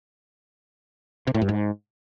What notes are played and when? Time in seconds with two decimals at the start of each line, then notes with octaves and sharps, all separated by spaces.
1.27 C3
1.34 A2
1.42 G2
1.49 G#2